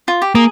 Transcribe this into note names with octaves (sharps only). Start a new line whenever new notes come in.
F4
G4
A#3 G#4